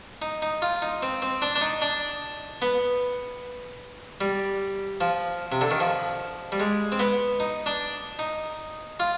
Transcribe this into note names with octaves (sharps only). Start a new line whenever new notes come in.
D#4
D#4
F4
D#4
C4
C4
D4
D4
D#4
D4
B3
G3
F3
C3
D3
D#3
F3
G3
G#3
C4
B3
D#4
D4
D#4
F4